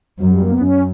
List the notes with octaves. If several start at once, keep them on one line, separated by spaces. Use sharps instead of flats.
F#2 F#3
G3
A#3
B3
F#2 C#4